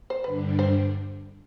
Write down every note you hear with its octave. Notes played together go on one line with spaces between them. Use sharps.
C5
G2 D3 G3 D4 B4
C5